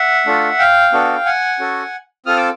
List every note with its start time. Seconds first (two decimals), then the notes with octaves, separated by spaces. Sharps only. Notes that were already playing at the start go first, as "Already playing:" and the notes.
Already playing: E5 F#5
0.26 A3 D4 F4 A4
0.59 F5 G5
0.92 B3 D4 F#4 A4
1.26 F#5 G#5
1.59 C#4 F#4 A4
2.26 C4 F4 A4 D#6 F6
2.37 D6 E6